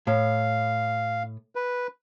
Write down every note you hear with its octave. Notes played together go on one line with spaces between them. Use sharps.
A2 F5
B4